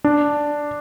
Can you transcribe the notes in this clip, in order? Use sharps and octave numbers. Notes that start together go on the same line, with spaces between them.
D4